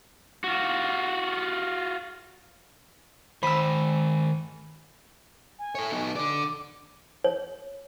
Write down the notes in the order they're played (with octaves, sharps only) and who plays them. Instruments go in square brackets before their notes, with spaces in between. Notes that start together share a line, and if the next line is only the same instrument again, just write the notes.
[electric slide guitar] F4 F#4
[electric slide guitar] D#3 C5 [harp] B5 E6
[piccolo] G#5
[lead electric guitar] A4 C#5
B3 D#4
[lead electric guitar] D3 D5 [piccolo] D6
[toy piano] C#5